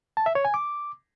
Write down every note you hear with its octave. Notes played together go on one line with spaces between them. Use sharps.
A5
E5
C#5
G#5
D6